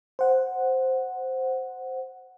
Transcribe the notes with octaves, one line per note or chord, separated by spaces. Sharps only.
C5 F#5